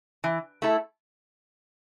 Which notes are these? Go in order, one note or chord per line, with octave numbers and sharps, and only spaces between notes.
E3
A3 E4 A4